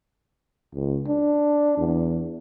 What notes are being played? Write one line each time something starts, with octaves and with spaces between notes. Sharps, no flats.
C#2
D4
E2